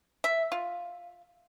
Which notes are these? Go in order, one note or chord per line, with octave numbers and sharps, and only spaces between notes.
E5
F4